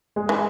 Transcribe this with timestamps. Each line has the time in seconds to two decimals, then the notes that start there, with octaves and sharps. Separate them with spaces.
0.16 G#3
0.29 E3